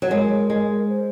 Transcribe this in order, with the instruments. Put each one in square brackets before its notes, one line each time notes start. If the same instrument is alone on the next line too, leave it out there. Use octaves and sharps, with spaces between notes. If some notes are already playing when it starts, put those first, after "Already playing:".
[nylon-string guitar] F#3
[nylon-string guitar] G#3 [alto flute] A#4
[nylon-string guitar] G#3
[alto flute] C5